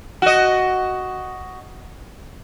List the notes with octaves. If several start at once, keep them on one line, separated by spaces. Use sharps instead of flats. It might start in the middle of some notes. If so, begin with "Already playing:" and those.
F#4 D#5